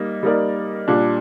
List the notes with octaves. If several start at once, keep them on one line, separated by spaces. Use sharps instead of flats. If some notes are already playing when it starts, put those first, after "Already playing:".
Already playing: G3 A#3 D#4
G3 A#3 D#4 A#4 D5
A#2 G3 D4